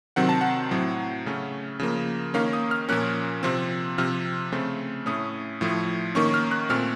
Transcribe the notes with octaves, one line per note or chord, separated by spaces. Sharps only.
C3 D#3 F#3 C4 F#5
A5
F#5
A2 F#3 C4
C#3 A3 C#4
C#3 F3 A#3
D#3 A#3 C#4 F5
D#6
F6
A#2 F3 A#3 C#4 F#6
C3 F3 C4
C3 F3 C4 F6
C#3 A3 C4
A2 A3 C#4 D#6
A2 F3 A3
D#3 A#3 C#4 C#6
F6
F#6
A#2 A3 C4 F6